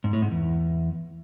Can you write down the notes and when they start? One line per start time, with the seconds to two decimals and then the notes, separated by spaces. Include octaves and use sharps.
0.04 G#2
0.13 A2
0.22 G#2
0.31 E2